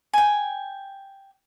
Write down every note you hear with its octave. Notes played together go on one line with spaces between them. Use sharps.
G5 G#5